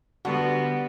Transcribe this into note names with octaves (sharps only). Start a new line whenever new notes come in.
D3 G3 B3 F#4